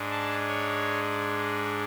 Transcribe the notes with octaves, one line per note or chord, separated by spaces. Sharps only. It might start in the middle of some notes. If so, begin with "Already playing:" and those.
Already playing: G#2 G#3 D4
A5
C#5